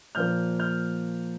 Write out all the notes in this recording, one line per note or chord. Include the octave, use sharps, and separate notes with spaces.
A#2 F3 A#3 F6 G6
F6 G6